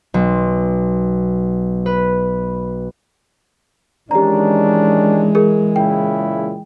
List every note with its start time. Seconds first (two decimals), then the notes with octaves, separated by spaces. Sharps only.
0.14 B1
1.86 B4
4.11 D#3 E3 G#3 C#4 D4 G4 A#5
5.35 G#4 A#4
5.76 A#2 C#3 E4 G5